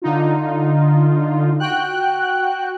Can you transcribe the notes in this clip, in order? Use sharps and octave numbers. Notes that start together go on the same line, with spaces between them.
D3 D#4 F4
F#4 G5 F#6